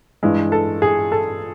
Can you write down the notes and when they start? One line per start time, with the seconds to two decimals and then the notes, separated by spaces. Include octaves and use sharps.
0.23 G2 E3 G#3
0.52 A4
0.82 G#4
1.12 A4